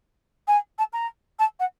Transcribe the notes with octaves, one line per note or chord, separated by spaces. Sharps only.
G#5
A5
A#5
A5
F#5